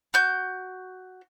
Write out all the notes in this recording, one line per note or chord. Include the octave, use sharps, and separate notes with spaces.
F#4 G6